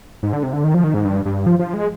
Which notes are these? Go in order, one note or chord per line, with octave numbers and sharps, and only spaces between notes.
G#2
D3
C3
D3
D#3
F3
D#3
G#2
G2
G2
F3
F3
G#3